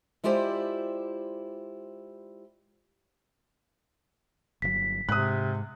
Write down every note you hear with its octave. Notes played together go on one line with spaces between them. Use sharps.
G#3 E4 F4 G4 C5 D5
G1 B2 F#3 B6
G#2 C3 D#6 F#6